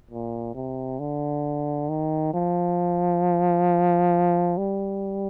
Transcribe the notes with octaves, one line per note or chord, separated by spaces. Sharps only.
A#2
C3
D3
D#3
F3
G3